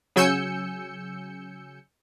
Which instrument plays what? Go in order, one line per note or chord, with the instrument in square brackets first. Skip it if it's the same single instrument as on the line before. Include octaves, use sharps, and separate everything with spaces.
[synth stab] C#3 F#3 G#5 E6 G6 C#7